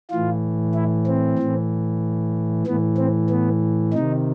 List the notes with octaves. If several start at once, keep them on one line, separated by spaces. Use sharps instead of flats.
A2 E3 F4
E4
C4
A2 E3
A2 E3 B3
C4
B3
C3 D#3 D#4